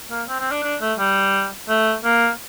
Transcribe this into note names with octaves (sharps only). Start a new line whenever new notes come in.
A#3
C4
C4
D4
D4
A3
G3
A3
A#3